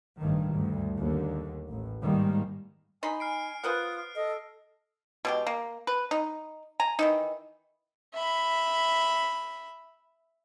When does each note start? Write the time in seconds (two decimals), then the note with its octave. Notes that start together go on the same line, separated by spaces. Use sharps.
0.20 A1 G2 D#3
0.55 D2 G2
0.96 D#2 D3
1.69 A1
2.02 G#2 D#3 G3 G#3 A#3
3.03 D#4 G#5 B5 C6
3.20 F6 C7 D7
3.64 F4 B4 C5 F#5 D#6 F6
4.15 A4 D#5
5.25 B2 G#3 G4
5.47 A#3
5.87 B4
6.11 D#4
6.80 G#5 A#5
6.99 D#3 E3 D#4
8.14 E5 B5